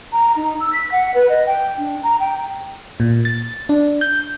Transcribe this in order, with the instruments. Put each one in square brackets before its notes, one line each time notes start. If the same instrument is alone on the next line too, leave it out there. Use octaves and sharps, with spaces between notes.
[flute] A#5
D#4
E6
B6
F#5
B4
D#5
G5
D4
A#5
G5
[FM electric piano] A#2
A6
D4
G6